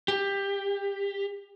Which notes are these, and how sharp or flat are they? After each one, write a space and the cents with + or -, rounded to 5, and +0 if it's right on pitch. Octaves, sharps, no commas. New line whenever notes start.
G4 +20